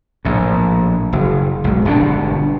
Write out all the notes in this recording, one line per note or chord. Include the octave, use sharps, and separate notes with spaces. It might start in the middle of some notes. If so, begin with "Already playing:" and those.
A#1 A2
F#1
B1 G#2
G1 B2 C4 D4